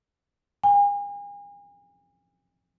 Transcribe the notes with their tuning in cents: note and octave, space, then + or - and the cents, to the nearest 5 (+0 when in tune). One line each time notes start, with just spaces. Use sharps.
G#5 -40